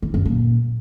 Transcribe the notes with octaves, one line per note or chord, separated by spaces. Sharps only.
E3
F#2
A#2